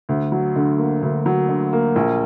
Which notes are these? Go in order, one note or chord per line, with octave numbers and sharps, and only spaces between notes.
D2
F#3
D3
A#3
D2
F#3
D3
A#3
A#1